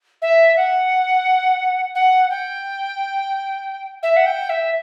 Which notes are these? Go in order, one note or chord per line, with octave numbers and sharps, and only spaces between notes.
E5
F#5
F#5
G5
E5
F#5
G5
E5